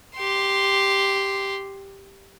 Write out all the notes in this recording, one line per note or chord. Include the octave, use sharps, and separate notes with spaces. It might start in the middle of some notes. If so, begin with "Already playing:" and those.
G4 C6